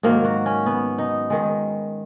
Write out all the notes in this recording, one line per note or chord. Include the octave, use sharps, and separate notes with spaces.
G#2 D#3 F#3 A#3
F#4
C#4
B3
D#4
G#2 D#3 G#3